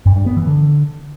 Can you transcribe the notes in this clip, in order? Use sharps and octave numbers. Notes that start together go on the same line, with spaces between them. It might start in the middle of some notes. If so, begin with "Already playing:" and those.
G2
G2
B3
E3
D3